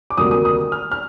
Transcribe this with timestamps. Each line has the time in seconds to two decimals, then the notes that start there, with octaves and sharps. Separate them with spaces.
0.10 D6
0.17 D2 C3 D#3 G3 A#3 D#6
0.31 D#6
0.45 D#6
0.72 F6
0.92 F6